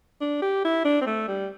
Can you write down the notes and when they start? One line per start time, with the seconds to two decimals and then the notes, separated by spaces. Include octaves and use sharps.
0.21 D4
0.42 G4
0.64 E4
0.85 D4
1.01 C4
1.06 A3
1.28 G3